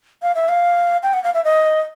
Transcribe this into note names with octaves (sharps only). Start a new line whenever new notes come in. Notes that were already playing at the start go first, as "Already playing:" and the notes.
F5
E5
F5
G5
F#5
F5
E5
D#5